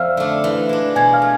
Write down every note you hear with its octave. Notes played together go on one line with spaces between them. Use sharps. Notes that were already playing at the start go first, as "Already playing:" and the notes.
Already playing: F2 C4 D5 E5 F5 E6 F6
D3 A3 D4
E3
G#3 D4
B2 G#5 G#6
F5 F6
A3